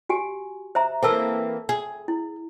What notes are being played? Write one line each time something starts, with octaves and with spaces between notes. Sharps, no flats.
F#4 G4 G#5
C5 E5 A#5
E3 A#3 C4 A4 A5 E6
G#4
E4